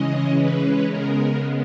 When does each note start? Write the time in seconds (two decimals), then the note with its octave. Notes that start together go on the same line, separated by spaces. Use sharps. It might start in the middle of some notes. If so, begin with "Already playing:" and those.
Already playing: C#3 E3 G#3 C#4 D#5
0.38 B4
0.89 C#3 G#3 B3 A#4